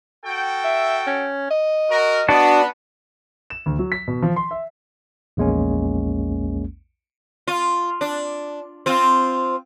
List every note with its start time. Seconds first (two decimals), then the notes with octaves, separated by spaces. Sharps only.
0.25 F#4 A4 G5
0.64 E5
1.07 C#4
1.51 D#5
1.90 F#4 A#4
2.28 B3 D4 F#4
3.50 E7
3.66 D2
3.79 F#3
3.92 B6
4.08 B2
4.22 F3
4.36 C6
4.51 E5
5.37 A#1 E2 G#3 A#3 C#4
7.48 F4
8.01 D4
8.86 C4 F4